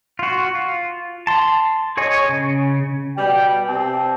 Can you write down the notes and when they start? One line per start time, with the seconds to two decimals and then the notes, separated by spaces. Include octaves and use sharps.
0.19 F4 F#4
0.55 F4
1.27 A5 C6
1.97 G#4 C#5 D#5 G#5
2.29 C#3
3.17 B2 G3 G5
3.67 C3 C4 G4 A5